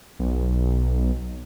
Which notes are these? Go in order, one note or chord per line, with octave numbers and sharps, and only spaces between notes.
B1